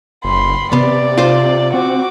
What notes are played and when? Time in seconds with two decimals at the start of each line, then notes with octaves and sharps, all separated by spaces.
0.24 F#1 B5 C6
0.73 C3 B3 D5
1.18 F4 C5
1.74 C4 F#4 D6